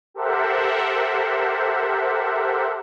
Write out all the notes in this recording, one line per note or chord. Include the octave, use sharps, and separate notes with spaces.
G4 A4 A#4 C5 E5 F#5